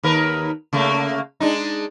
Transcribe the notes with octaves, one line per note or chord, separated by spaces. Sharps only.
D#2 A#4 B4
C#3 A3 A#3
G#3 D4 D#4